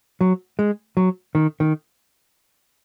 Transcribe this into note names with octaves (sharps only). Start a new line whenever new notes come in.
F#3
G#3
F#3
D#3
D#3